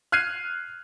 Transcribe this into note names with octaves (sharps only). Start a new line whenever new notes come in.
F6 F#6 G#6 C7 D#7